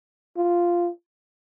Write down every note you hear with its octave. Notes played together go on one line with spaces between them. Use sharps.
F4